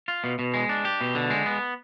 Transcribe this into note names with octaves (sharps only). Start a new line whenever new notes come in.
F4
B2
B2
G#3
D4
G4
B2
D3
G#3
B3